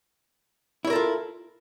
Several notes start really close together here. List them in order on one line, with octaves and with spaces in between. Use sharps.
E4 C#5 A#4 A4 F4